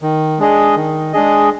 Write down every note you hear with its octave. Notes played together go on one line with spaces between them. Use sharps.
D#3
G#3 D4 G#4 D#5
D#3
G#3 D4 G#4 D#5